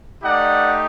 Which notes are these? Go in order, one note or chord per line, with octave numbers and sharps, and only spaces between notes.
A3 D#4 G4 D5 F#5